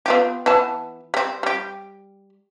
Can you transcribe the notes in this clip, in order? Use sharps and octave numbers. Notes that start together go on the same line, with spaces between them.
B3 F4 G4
E3 B3 A5
G3 C4
G3 G4